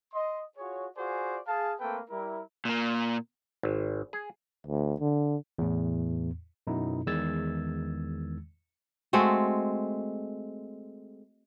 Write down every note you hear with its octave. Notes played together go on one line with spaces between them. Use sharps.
D#5 C6
F4 F#4 G#4 C#5
F4 F#4 G#4 C5 D5 G#5
G#4 F5 A5
A3 A#3 C4 A4 B4 G5
G3 E4 A#4
A#2 A#3
G#1
G#4
D2
D3
E2 A2
F#2 B2 B3 D#4 E4
E2 D#3 G#3 E6 G#6 A6
G#3 A3 C4 F#4